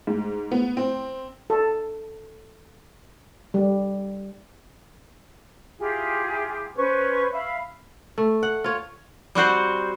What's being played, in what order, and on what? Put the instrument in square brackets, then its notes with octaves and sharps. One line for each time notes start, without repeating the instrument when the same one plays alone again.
[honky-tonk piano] G#2
B3
C4
[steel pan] A4
G3
[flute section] E4 F4 G4 G#4
C#4 B4 C5 C#6
E5 F5 B5
[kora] A3
F#5
F4 C#5
[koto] G3 C4 F#4 C5